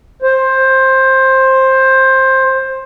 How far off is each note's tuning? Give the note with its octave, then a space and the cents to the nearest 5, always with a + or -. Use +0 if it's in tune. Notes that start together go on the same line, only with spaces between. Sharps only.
C5 +15